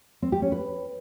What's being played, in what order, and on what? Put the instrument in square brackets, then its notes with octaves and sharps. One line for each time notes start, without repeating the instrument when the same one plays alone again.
[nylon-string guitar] C4
G4
C#4
B4